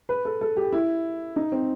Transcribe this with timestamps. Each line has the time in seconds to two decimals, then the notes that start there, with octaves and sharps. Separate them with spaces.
0.09 B4
0.25 A4
0.41 A4
0.57 G4
0.72 E4
1.36 D#4
1.52 C4